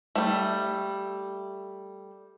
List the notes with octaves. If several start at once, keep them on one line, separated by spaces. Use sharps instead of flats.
G3 A3